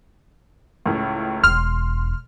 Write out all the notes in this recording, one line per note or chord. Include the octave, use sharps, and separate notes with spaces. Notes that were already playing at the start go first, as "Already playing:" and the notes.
C#2 A2
E1 C6 F6